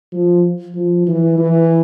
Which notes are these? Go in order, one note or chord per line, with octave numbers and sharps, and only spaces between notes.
F3
F3
E3
E3